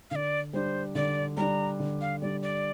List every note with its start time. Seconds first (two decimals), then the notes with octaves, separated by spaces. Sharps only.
0.11 D3 D5 F5
0.53 G3 D4 C5
0.95 D3 D5
1.37 G3 D4 A#5
1.80 D3
2.01 F5
2.22 G3 D4 D5
2.43 D5